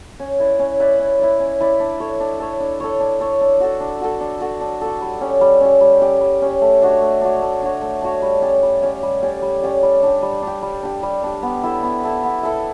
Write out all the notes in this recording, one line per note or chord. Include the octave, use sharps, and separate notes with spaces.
C#4
E4 B4 D5
C#4
E4 B4 D5
C#4
E4 B4 D5
C#4
E4 B4 D5
D4
A4 C#5
D4
A4 C#5
D4
A4 C#5
D4
A4 C#5
D4
F#4 A4
D4
F#4 A4
D4
F#4 A4
D4
F#4 A4
G3
C#4 G4
G3
C#4 G4
G3
C#4 G4
G3
C#4 G4
A3
D4 F#4 C#5
A3
D4 F#4 C#5
A3
D4 F#4 C#5
A3
D4 F#4 C#5
G3
C#4 G4 D5
G3
C#4 G4 D5
G3
C#4 G4 D5
G3
C#4 G4 D5
G3
D4 G4
G3
D4 G4
G3
D4 G4
G3
D4 G4
B3
E4 A4 E5
B3
E4 A4 E5
B3
E4 A4 E5